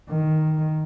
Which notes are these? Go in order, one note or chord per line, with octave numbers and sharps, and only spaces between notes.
D#3